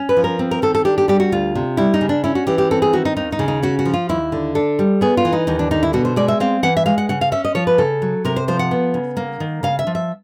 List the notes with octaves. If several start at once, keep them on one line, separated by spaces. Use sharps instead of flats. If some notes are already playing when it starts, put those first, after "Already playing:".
Already playing: C#4
B4
F3
A#4
C4
A#4
D#3 A4
A4
D4 G4
G4
G3 G4
F#4
D2 F4
C3
G3 E4
D#4
C#3
D4
C#4 E4
F#4
E3 G4
G4
C4 A4
G#4
D#3 F#4
D#4
D#2 D#4
D#4
C#3
D#4
C#4 F#4
F#4
F3
F4
D#2 E4
D3
D4 A4
G3
B3 G#4
F4
E3
D#4
D#2 D#4
D4
D3 D#4
E4
B2 F#4
C5
G#3 D5
E5
C4 F5
E3 F#5
E5
G#3 F5
F#5
C#3 F#5
F5
C#4 E5
D#5
F3 C#5
B4
C#3 A4
F#3
C3 A#4
C5
F3 C5
F#5
B3
C#3
A#3
D#3
C#3 F5
E5
F3
E5